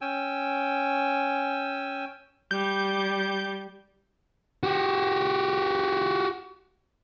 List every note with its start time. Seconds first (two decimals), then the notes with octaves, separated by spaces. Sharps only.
0.01 C#4 G5 G#5 E6
2.51 G3 G6
4.63 F#4 G4